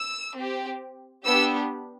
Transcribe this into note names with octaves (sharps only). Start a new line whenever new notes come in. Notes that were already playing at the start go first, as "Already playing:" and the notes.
Already playing: E6
C4 G4
B3 D4 G4 E6